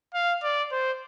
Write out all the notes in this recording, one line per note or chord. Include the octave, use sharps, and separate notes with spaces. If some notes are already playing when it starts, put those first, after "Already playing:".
F5
D5
C5